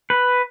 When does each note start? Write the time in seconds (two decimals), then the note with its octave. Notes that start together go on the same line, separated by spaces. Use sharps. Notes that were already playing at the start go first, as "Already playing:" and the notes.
0.10 B4